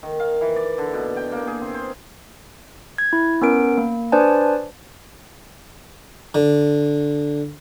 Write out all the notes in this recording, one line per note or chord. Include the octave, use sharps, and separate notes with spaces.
D#3
F5
E3
D5
D3
B2
G5
A#3
G#4
C4
C5
G#6
E4
B3 C#4 A#4 D7
A#3
D4 B4 C5 D5 G#5 A5
D3